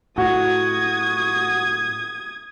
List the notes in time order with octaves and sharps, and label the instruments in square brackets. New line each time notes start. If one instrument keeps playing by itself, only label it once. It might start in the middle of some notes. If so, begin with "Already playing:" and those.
[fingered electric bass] A2 [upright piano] F#4 [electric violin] D#6 G#6